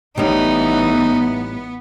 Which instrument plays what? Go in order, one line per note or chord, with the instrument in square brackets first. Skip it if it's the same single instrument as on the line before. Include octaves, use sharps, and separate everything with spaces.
[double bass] A1 E3 [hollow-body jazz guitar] A2 G3 [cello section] B3 [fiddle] D#4